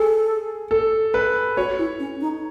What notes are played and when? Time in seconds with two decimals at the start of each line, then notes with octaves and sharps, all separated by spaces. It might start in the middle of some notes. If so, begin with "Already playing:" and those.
Already playing: G#4 A4
0.71 A4
1.14 B4
1.57 F#4 C#5
1.78 E4
1.99 C#4
2.20 D#4